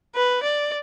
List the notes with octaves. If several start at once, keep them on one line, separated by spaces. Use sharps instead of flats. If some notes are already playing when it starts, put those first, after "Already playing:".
B4
D5